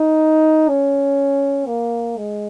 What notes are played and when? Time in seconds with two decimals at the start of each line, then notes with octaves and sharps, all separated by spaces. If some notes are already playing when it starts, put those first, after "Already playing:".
Already playing: D#4
0.68 C#4
1.67 A#3
2.17 G#3